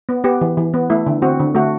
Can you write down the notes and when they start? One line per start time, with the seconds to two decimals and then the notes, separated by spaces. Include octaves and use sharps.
0.09 B3
0.24 B3 G4
0.41 E3
0.57 E3
0.74 B3
0.90 A3 E4
1.06 D3
1.22 C4 F#4
1.40 D3
1.55 A3 F#4